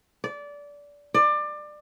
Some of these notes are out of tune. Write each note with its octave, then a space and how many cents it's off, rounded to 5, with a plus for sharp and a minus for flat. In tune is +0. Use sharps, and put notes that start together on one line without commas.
D5 -20
D5 +25